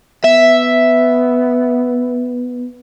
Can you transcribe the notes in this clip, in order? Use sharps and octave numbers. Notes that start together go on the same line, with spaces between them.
B3 E5